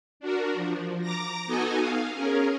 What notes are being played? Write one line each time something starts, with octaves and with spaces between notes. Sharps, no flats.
D4 F#4 A#4
F3
A#5 D6 A#6
B3 D#4 F#4 A4 D#5 G#5
F5
C#4 G#4 A#4